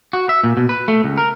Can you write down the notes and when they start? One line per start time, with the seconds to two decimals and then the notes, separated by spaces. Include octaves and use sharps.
0.13 F#4
0.29 E5
0.44 A#2
0.57 B2
0.69 B4
0.88 A3
1.04 C#2
1.18 A#4